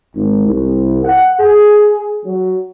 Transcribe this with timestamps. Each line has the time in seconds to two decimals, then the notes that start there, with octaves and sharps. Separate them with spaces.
0.15 G#1
0.46 C2
1.04 F#5
1.39 G#4
2.25 F#3